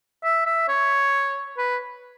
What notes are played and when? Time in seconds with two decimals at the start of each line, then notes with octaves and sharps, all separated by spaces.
0.24 E5
0.46 E5
0.68 C#5
1.58 B4